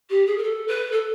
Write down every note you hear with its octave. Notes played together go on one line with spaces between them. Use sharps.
G4
G#4
A#4
A4
B4
A4